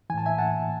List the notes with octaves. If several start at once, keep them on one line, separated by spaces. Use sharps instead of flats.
A2 E3 G#5 A5
E5 G#5
F#5 A5